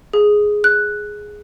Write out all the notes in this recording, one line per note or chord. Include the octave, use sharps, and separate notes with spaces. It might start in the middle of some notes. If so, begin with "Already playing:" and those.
G#4
F#6